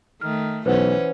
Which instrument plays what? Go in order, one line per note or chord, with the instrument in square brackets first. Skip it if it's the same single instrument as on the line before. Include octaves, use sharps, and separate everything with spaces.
[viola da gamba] D#3 A3 [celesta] F6
[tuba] B1 [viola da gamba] E3 C#4 [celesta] B4 C5 F#5